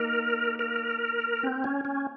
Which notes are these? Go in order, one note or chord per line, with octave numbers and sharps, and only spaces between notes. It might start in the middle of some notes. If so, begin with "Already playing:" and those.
Already playing: A#3 D#4 A#4
A#4
C4
C#4
C#4